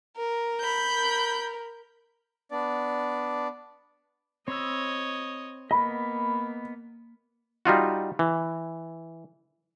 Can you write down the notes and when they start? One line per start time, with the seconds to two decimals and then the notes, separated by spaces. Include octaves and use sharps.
0.17 A#4
0.61 B5 G6
0.94 A#4
2.50 B3 D4 D5
4.48 C4 C#5 D#5 B5 E6
5.71 A#3 B3 D#5 B5
7.65 G3 D#4 F4 F#4
8.19 E3